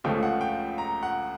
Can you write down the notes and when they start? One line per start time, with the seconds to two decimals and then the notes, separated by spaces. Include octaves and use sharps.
0.04 C#2 C#3 F3 A3 G5
0.23 F#5
0.41 G5
0.78 A#5
1.03 F#5